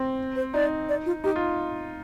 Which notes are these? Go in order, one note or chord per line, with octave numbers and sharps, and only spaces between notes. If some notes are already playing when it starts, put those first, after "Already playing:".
Already playing: C4
C5
D#4 D5
D5
F4
D#4 G4
F4